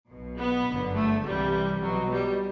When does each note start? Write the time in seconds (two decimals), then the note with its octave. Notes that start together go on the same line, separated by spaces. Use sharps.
0.08 B1 B2
0.37 B3
0.67 G1 F#2 D3
0.95 A3
1.24 C2 C3 E3 G3
1.82 B1 B2 F#3
2.10 G3